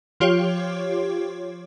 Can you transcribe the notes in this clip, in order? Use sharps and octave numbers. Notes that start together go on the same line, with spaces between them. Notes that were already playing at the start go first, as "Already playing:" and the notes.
F3 F4 G4 C#5